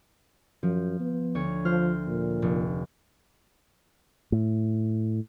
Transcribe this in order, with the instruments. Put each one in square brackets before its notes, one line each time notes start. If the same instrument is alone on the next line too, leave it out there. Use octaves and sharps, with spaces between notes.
[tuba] F#2 [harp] F3
[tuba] B3
[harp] D2 C#5 D#7
[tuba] F3 [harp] C5 F6
[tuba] A#2
[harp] F1
[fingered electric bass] A2